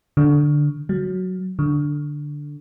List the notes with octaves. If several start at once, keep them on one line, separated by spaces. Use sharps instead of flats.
D3
F#3
D3